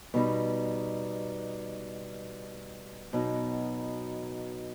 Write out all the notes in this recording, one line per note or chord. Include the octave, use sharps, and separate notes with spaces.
B2 G3 D#4
B2 F#3 B3 D#4